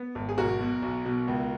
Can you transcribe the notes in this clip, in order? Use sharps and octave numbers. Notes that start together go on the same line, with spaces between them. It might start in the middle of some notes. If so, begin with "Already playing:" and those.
Already playing: B3
G#1
G#4
B1 F#4 A#4
B2
B1
B2
C#2